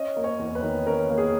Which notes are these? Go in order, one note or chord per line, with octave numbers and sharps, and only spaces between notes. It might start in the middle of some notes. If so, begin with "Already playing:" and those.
Already playing: C#4 D#5
A#3
C#5
E2
B4
D#3
C#4 A#4
A#3
G#4